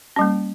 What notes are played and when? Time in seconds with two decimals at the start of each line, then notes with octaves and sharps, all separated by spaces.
0.16 C#4
0.19 G3
0.21 A#3